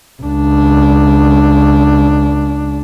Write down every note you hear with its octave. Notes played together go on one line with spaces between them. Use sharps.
C#2 D4